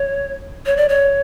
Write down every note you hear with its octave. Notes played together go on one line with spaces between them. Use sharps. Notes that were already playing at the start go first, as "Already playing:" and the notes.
Already playing: C#5
C#5
D5
C#5